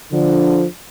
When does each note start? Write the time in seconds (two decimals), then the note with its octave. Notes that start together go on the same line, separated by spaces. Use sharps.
0.13 D3 F3